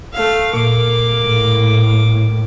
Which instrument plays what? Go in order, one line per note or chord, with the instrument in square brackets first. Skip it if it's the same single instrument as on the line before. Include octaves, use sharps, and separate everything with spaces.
[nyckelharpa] A3 F5
[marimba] A#2 [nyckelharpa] A#3 D6
[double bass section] A2